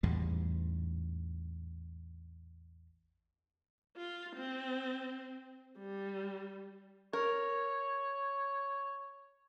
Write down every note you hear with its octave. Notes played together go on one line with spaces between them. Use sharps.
A1 E2 G#2 G3
F4
C4
G3
A#4 C#5